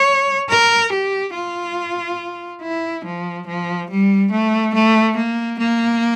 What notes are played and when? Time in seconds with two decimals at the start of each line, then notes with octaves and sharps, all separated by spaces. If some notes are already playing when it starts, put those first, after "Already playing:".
Already playing: C#5
0.50 A#4
0.92 G4
1.35 F4
2.62 E4
3.05 F3
3.47 F3
3.90 G3
4.31 A3
4.74 A3
5.17 A#3
5.59 A#3